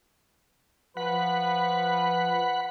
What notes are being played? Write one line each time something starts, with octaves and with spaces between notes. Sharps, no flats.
F3 B4 F#5 B5